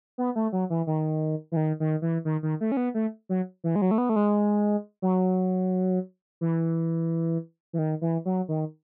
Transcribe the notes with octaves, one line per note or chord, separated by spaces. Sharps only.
B3
A3
F#3
E3
D#3
E3
D#3
D#3
E3
D#3
D#3
A3
C#4
B3
A3
F#3
E3
G#3
F#3
A3
B3
A3
G#3
F#3
E3
E3
D#3
E3
F#3
D#3